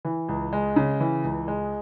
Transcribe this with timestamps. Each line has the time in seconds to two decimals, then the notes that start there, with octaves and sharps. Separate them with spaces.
0.05 E3
0.28 C#2
0.53 G#3
0.76 C#3
1.00 E3
1.24 C#2
1.48 G#3